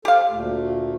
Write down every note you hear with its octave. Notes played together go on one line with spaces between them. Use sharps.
G4 A4 C5 F5
D2 A#2 A3